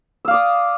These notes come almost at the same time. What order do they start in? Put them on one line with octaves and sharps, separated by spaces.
E6 F5 D5 D#6